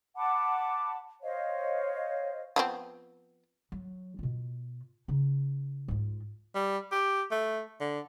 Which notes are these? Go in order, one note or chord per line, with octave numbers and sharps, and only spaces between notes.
F#5 A5 B5 D6
C5 C#5 D#5 F5
F3 B3 C4
F#3
B2 F4
C#3 D#4
G#2 F4
G3
G4
A3
D3